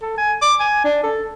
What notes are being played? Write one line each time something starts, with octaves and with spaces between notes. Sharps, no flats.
A4
G#5
D6
G#5
D4
A4